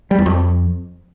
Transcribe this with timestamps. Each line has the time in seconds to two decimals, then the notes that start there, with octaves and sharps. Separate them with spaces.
0.11 G3
0.18 E2
0.26 F2